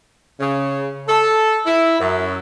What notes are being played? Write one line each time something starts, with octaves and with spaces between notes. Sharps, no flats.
C#3
A4
E4
F#2